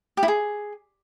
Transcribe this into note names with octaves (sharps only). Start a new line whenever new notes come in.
G4
E4
G#4